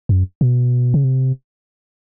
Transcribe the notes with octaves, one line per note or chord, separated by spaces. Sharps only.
F#2
B2
C#3
C3